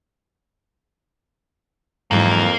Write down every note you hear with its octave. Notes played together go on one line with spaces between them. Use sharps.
F2 G#2 E3 F#3 A#3